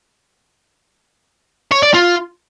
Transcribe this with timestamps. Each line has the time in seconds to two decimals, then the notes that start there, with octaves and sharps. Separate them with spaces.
1.72 C#5
1.83 D5
1.94 F4